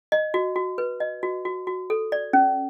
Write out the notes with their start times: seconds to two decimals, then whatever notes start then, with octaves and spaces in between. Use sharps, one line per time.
0.12 D#5
0.34 F#4
0.56 F#4
0.78 B4
1.00 D#5
1.23 F#4
1.45 F#4
1.67 F#4
1.90 A4
2.12 D5
2.33 C#4